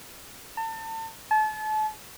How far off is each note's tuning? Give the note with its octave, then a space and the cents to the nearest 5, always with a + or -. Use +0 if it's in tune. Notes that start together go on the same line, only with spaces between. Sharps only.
A5 +35
A5 -35